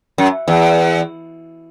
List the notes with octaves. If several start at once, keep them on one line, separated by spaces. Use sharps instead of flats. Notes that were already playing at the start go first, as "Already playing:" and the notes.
F#2
E2